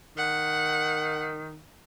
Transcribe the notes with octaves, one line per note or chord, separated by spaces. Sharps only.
D#3 F#5